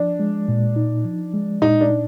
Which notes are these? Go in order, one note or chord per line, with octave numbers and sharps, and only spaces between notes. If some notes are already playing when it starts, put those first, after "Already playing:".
Already playing: F3 D4
G#3
A#2
D#4
F3
G#3
A#2 D#4
D4
D#4